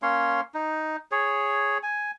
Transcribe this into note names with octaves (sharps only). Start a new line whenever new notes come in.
A#3 C#4 C#5 C6
D#4
G#4 C#5
G#5